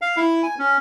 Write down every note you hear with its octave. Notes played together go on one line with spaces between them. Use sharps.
F5
E4
G#5
C#4